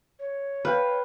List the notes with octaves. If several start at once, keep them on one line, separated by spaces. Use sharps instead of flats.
C#5
B4 F5 G5